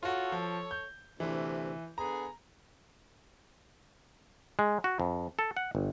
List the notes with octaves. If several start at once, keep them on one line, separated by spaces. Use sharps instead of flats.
F4 F#4 A4 C#5
F3
G6
D2 C3 E3
D3 B3 G#4 A#5
G#3
F#4
F2
A4
F#5
G1